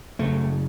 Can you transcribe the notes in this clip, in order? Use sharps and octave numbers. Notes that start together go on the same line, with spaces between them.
F#2 C#3 A3